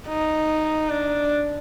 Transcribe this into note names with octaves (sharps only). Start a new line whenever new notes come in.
D#4
D4